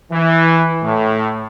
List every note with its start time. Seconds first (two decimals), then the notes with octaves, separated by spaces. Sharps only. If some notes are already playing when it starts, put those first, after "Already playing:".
0.12 E3
0.83 A2